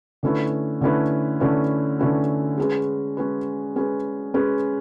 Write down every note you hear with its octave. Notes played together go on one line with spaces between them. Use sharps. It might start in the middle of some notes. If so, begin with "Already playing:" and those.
D3 A3 C#4 E4 B4
D3 A3 C#4 E4 B4
D3 A3 C#4 E4 B4
D3 A3 C#4 E4 B4
G#3 C#4 G#4 B4
G#3 C#4 G#4 B4
G#3 C#4 G#4 B4
G#3 C#4 G#4 B4